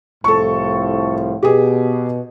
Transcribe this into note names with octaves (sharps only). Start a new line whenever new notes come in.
C2 A2 F3 A4 C#6
B2 G4 G#4